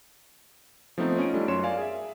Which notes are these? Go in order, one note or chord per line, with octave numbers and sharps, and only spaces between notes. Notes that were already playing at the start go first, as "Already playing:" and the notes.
F3 A3 B3 C4 D#4
C#4 F4 D#5 D7
G3 A3 C#4 D4 F4
F#2 C#5 C6 E7
A#4 D5 F5 G#5
G#4 E5